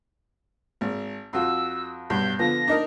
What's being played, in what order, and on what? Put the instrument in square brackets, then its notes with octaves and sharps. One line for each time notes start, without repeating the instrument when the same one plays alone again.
[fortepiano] G#1
[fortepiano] F2 F4 F#4 [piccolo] E6
[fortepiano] B1 G2 [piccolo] G6
[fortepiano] D3 F3 B3 [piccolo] A#6
[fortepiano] D4 D#4 A#4